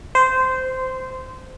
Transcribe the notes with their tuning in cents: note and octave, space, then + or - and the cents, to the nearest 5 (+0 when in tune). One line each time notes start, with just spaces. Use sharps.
C5 -15